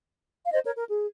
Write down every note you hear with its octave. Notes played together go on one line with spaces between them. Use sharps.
F5
C5 D#5
A#4 C#5
A#4
G#4